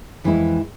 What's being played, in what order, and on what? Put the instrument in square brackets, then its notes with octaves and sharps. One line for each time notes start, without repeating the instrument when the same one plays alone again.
[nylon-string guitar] F2 E3 G#3 E4